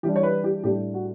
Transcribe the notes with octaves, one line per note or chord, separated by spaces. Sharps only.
E3 G3 D4 G4
C#5
B4
G4
A2 G3 D4 G4
F#4